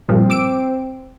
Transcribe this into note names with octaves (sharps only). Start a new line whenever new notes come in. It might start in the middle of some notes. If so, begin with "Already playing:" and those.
G2 A#2 F3 C4
D6 E6 D7